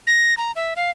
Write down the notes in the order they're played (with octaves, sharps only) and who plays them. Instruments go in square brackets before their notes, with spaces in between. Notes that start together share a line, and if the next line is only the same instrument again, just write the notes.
[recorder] A#6
A#5
E5
F5